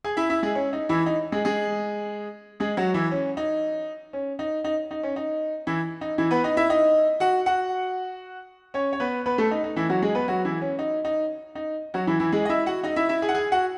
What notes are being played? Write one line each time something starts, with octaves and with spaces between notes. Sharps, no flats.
G#4 G#5
E4 E5
E4 E5
G#3 G#4
C#4
D#4
E3 E4
D#4
G#3 G#4
G#3 G#4
G#3 G#4
F#3 F#4
E3 E4
C#4
D#4
C#4
D#4
D#4
D#4
C#4
D#4
E3 E4
D#4
E3 E4
B3 B4
D#4 D#5
E4 E5
D#4 D#5
F#4 F#5
F#4 F#5
C#4 C#5
C#5
B3 B4
B3 B4
A3 A4
D#4
D#4
E3 E4
F#3 F#4
G#3 G#4
B3 B4
F#3 F#4
E3 E4
C#4
D#4
D#4
D#4
F#3 F#4
E3 E4
E3 E4
G#3 G#4
D#5
E4 E5
F#4 F#5
D#4 D#5
E4 E5
E4 E5
G#4 G#5
F#5
G#4 G#5
F#4 F#5